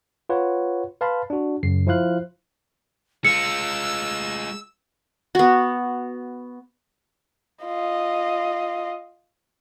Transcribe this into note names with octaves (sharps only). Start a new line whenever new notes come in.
F4 B4 C#5 F#5
B4 F5 A5 B5 C6
D4 F#4
F#2 C#3 C7
F3 E4 C5 F5 F#6
G#3 F4 E6 C#7
B3 F#4
F4 D#5